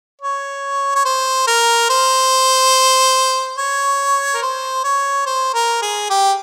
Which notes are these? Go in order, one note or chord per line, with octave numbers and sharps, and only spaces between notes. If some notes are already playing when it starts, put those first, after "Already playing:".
C#5
C#5
C5
A#4
C5
C#5
A#4
C5
C#5
C5
A#4
G#4
G4